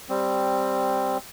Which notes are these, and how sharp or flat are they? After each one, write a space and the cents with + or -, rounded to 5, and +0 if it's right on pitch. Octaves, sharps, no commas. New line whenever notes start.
G3 +0 C4 +0